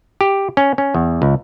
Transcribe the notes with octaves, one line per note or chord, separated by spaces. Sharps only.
G4
C#4
C#4
E2
C#2